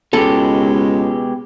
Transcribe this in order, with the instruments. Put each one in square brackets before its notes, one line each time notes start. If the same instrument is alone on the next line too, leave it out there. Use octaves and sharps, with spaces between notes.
[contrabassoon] C#2 [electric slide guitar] B2 G#3 G4 [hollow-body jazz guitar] A4